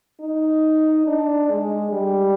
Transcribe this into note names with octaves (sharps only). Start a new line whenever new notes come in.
D#4
D4
G#3
G3